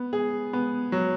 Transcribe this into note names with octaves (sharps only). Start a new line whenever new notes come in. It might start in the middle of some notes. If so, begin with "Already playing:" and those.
Already playing: B3
G#4
B3
F#3